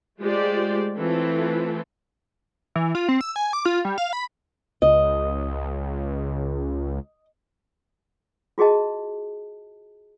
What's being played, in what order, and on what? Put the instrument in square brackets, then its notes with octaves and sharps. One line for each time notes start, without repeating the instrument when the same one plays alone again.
[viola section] G#3 A3 F4 G4 C5 D5
E3 A3 C4 E4 F4 A4
[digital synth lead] E3
F4
C4
E6
G#5
D6
F4
G3
F5
B5
[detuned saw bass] C#2 [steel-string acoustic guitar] D#5
[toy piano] F4 F#4 G#4 D#5 A5